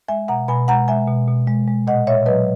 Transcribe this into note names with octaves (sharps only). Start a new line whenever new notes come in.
G#3 E5 G#5
B2 F#5 A#5
B2 G#5 B5
G#3 F#5 A#5
G#3 E5 G#5
B2
B2
G#3
G#3
A#2 D#5 F#5
A#2 C#5 E5
F#3 B4 D#5